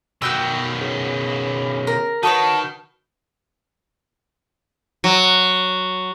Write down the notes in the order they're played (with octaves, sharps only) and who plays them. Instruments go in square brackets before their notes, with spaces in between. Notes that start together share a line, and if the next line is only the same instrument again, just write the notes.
[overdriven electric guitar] B2 D#3 [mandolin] F#4 G5 E6
[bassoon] C#3
[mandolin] A#4
[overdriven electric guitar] D#3 [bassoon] F#4 [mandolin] B4 C#5 D#6 [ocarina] A5
[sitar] F#3